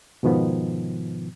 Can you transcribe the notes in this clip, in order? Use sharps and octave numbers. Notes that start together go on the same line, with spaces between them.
G#2 B2 D#3 F3 B3